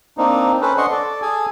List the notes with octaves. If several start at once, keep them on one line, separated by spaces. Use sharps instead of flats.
A#3 C4 D4 D#4
C#4 A4 B4 C5
D4 D#5 F#5 C6 C#6
A4 D5
G#4 A4 G#5